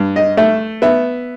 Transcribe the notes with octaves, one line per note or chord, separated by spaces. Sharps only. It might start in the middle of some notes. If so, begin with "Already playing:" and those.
Already playing: G2
D#5
A3 E5
B3 E5